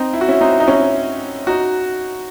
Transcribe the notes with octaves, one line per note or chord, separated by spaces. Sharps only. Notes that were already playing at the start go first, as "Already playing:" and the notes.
Already playing: C4 D#4
E4
F#4
C#4 E4
C4 D#4
D#4
C#4 E4
D#4 F#4